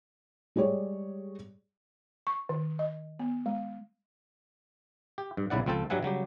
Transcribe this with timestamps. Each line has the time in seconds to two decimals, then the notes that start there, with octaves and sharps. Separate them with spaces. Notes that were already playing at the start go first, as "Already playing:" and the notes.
0.56 G3 G#3 G4 C#5 D5
2.27 C#6
2.49 D#3
2.79 D#5
3.19 B3
3.46 G#3
5.18 G4
5.37 G2
5.50 B1 C#3 E4 D5 F#5
5.66 C#2 F3 C4 A4 G5
5.90 G2 F#3 G3 E5 F#5 G#5
6.03 C#3 F#3 G3 G4